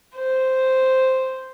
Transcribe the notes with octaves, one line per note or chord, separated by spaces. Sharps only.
C5